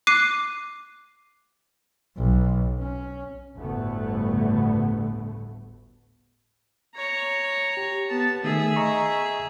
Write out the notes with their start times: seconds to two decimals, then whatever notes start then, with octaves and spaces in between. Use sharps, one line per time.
0.07 D6 F#6 C7 D#7
2.17 B1
2.79 C#4
3.56 G1 D2 A2 D3 A3 B3
6.95 C#5 A#5
7.77 G4
8.09 B3 A5
8.44 D#3 A3 G#4 E5
8.76 D#5 A#5 C#6